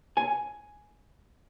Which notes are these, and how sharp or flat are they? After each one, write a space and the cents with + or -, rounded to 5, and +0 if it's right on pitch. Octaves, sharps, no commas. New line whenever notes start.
G#5 +5